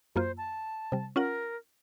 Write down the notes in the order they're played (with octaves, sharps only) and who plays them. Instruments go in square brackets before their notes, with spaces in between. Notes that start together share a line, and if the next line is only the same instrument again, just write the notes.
[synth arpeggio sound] F#2 A#3 F4 [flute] C5
[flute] A5
[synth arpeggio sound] C3 G3
[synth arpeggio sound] C#4 F4 F#5 [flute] A#4